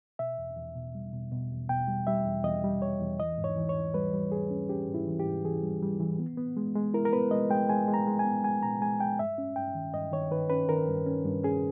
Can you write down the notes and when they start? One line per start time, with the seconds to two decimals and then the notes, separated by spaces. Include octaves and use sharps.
0.19 B2 E5
0.38 E2
0.57 E2
0.75 B2
0.95 G3
1.13 B2
1.32 B2
1.51 E2
1.69 B2 G5
1.88 G3
2.07 G3 E5
2.26 E2
2.44 E2 D#5
2.64 G3
2.82 E2 C#5
3.01 E2
3.20 E3 D#5
3.38 G#2
3.44 C#5
3.57 E3
3.69 C#5
3.75 E3
3.94 G3 B4
4.13 G3
4.32 G3 G#4
4.51 C#4
4.69 C#4 G4
4.88 G#2
4.94 E4
5.07 E3
5.20 G4
5.25 G#2
5.44 E3 G#4
5.63 G3
5.82 G3
6.00 E3
6.19 B3
6.37 B3
6.57 G#3
6.75 G#3
6.94 E4 A#4
7.05 A#4
7.13 B3 B4
7.31 G#3 D#5
7.50 G#3 G5
7.69 G#3 G#5
7.88 G#3
7.94 A#5
8.07 G#3
8.19 G#5
8.25 B3
8.44 G#3 G#5
8.62 A#2 A#5
8.81 G#3 G#5
9.00 G#3 G5
9.19 G2 E5
9.38 C#4
9.56 G2 G5
9.75 D#3
9.93 G2 D#5
10.12 D#3 C#5
10.31 D#3 B4
10.50 C#4 B4
10.69 D#3 A#4
10.88 G2
11.06 C#4
11.25 G2
11.44 C#4 G#4